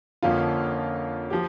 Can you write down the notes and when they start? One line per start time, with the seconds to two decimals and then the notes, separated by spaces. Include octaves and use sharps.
0.22 F2 D3 F3 A#3 C#4 F4
1.30 F3 G4